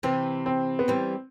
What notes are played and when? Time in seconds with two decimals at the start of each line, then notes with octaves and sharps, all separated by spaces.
0.03 C3 E3 C4
0.46 C4
0.79 B3
0.88 E3 G3 C4